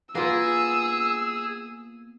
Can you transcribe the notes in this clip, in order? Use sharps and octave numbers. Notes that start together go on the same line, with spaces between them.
A#3 B3 F4 G#4 E6